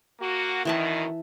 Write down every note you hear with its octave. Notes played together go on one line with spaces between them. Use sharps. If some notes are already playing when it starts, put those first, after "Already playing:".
A#3 F#4
F#2 B2 D#3 E3 E5 A5